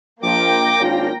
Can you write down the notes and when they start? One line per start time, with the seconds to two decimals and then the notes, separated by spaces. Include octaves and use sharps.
0.23 A#1 F3 A#3 G5 D6 A#6
0.80 G#1 C#4 D4 F4